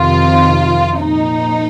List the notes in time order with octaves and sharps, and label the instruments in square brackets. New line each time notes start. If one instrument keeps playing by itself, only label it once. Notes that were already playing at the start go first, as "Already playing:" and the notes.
Already playing: [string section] F2 C3 D#3 F4
A#2 F3 D#4